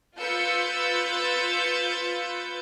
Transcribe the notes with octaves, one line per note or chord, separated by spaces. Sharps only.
F4 B4 E6 G6 A6 C#7